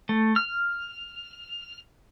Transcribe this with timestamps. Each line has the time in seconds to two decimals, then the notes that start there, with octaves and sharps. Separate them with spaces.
0.09 A3
0.36 F6